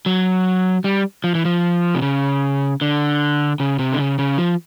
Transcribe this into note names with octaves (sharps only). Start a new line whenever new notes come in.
F#3
G3
F3
E3
F3
C3
C#3
D3
C#3
C3
D3
C#3
C#3
F3